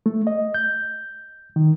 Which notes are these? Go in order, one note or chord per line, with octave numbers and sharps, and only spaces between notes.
A3
D#5
G6
D#3